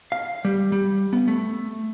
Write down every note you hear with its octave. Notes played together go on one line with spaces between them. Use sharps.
F5
G3
G3
B3
A3